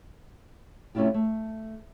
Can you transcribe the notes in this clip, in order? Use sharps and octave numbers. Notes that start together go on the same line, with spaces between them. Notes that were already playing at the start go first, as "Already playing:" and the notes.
C3 A3 C#4 E4 F4 G4
A3